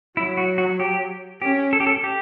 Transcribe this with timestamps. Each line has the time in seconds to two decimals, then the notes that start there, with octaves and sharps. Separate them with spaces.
0.17 F#3 E4
0.37 F#4
0.58 F#4
0.80 G4
1.42 C#4 G4
1.73 A4
1.80 G4
1.87 A4
2.04 G4